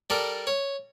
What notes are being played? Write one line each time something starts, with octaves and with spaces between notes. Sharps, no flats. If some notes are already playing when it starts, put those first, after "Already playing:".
G3 A4 A#4 D5
C#5